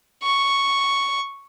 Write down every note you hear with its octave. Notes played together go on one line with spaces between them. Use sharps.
C#6